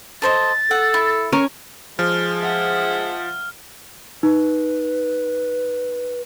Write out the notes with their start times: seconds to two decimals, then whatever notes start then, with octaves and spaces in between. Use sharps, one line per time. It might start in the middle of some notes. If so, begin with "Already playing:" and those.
0.22 A4 C5 D#5 A6
0.71 A4 F#5
0.94 E4
1.33 C#4 A#4 C#6
1.99 F3 G#3 G#4 F6
2.40 E5 F#5
4.23 D#4 B4